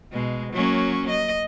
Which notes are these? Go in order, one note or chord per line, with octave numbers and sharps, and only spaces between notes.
B2 G#3
F#3 A#3 C#4
D#5